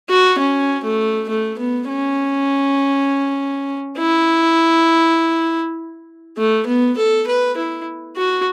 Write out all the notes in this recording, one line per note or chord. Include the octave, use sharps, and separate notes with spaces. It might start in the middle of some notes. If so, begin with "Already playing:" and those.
F#4
C#4
A3
A3
B3
C#4
E4
A3
B3
A4
B4
E4
F#4